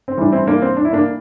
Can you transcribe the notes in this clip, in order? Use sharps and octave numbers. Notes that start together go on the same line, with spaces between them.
C4
A2 E3 G3 D4
C4 E4
A#3 D4
C4
D4
E4
A#3 D4